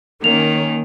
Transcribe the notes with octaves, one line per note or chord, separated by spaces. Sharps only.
D#3 A#3 C#4 F7